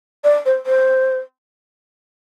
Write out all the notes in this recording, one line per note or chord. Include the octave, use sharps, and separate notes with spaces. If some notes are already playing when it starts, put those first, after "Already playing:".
D5
C5
C5